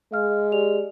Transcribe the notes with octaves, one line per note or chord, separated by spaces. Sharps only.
G#3 F5 F6
G4 D5 F7